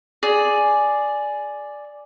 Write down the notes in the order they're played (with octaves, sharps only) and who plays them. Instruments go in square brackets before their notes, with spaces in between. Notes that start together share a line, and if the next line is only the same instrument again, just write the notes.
[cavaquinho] G#4 D5